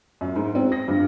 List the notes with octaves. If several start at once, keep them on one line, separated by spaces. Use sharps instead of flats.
F#2
G#2
C4
A#6
G2